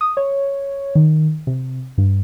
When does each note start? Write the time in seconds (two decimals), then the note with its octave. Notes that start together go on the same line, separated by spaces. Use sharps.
0.01 D#6
0.17 C#5
0.95 D#3
1.47 C3
1.98 G2